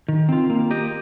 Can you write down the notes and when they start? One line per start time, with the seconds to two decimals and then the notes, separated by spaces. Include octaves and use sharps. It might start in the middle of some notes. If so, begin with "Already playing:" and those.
0.08 D#3
0.29 C4 F4
0.50 A#3
0.71 G4 D#5